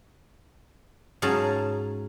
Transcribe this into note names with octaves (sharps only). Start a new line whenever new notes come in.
G#2 F#3 C#4 G#4 F5 A5